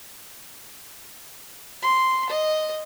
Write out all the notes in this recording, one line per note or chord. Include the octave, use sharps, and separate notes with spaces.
C6
D#5